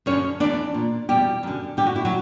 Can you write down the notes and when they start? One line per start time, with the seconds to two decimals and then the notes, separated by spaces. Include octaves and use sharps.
0.06 F#2 D3 C#4 C#5
0.40 E2 C#3 E3 D4 D5
0.74 A#2
1.09 E2 B2 G3 G4
1.43 F#2 D3
1.77 G2 D3 G4
1.87 F#4
1.96 E4
2.05 F#3 F#4